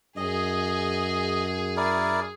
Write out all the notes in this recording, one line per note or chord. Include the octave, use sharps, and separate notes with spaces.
F#2 G#4 D#5
E4 A#4 D5